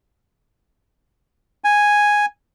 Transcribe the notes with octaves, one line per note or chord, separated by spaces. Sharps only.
G#5